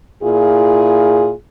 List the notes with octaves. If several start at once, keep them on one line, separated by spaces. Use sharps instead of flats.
A#2 E4 F4 G#4